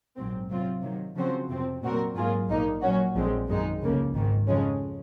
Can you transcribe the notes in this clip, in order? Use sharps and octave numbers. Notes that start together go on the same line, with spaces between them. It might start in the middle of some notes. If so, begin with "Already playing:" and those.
A#1 G#2 F#3 C4
C3 F#3 C4 F4
C3 D#3 F#3
C#3 F3 C4 F#4 C5
F2 C3 F3 C4
A#2 F#3 C4 F#4 A#4
G#2 F#3 A#3 F4 G#4
A#1 A#2 F3 A#3 D#4
A#2 F#3 C#4 F#4
A#1 A#2 F3 G#3 C4
F#2 D#3 G#3 D#4
C#2 C#3 F3 A#3
G#1 G#2 D#3
F2 C#3 F3 G#3 C#4